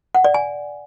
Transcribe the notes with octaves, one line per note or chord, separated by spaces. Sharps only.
F#5
D5
G#5